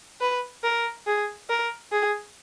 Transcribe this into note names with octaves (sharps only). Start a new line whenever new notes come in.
B4
A#4
G#4
A#4
G#4